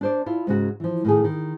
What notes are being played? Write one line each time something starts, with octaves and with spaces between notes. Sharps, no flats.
D4 C5 D5
E4 F4
G#2 C#3 F#4
E3 F3
A2 D#3 G#4
D#3